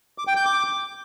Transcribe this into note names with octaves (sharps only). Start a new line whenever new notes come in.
D6
G5
G6
D6